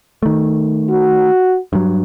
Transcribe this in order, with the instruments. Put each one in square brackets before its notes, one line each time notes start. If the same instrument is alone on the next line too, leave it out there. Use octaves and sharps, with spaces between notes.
[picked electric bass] D#3 A3
[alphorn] F#4
[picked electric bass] G2 F#3